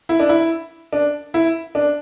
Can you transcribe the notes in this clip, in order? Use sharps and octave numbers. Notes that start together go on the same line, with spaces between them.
E4
D4
E4
D4
E4
D4